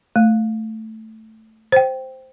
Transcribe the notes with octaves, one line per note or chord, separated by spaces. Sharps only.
A3
C5 G5